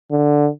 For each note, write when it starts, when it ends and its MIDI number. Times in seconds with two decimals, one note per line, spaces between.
0.11 0.48 50